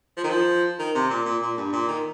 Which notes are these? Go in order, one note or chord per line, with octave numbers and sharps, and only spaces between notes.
F3
D#3
F3
D#3
C3
A#2
A#2
A#2
G2
A#2
D#3